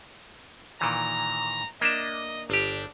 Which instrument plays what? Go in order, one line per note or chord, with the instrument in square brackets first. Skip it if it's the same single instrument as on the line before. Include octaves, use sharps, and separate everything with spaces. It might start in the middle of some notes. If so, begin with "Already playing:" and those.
[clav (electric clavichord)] A#2 D#3 E3 [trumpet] A#5
[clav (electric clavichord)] A#3 D4 E5 [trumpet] D#5
[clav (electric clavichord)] G1 G4 [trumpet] D4